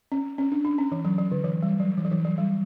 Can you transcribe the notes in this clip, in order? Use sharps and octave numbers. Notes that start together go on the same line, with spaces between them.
C#4
C#4
D4
D4
C#4
E3
F#3
F#3
D3
E3
G3
F#3
E3
F#3
E3
F#3
G3